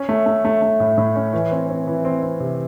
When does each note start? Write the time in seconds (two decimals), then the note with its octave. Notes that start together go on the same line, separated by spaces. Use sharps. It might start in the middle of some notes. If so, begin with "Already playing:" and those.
Already playing: C#4
0.09 A3
0.26 A3
0.45 A3
0.62 A3
0.80 A2
0.98 A2
1.16 C#4
1.33 E3
1.52 C4
1.69 C4
1.87 E3
2.05 C4
2.23 C4
2.40 C3